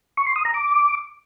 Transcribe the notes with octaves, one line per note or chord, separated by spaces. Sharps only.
C#6
C6
D#6
A#5
D6